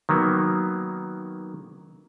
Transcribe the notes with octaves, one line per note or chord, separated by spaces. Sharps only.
D#3 F#3 A#3 B3